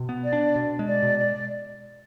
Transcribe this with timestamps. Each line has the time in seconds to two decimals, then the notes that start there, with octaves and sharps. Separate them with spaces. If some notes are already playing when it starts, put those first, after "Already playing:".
Already playing: B2
0.09 B3
0.24 D5
0.33 D4
0.56 B2
0.79 G#3
0.88 D5
1.03 B2
1.19 D5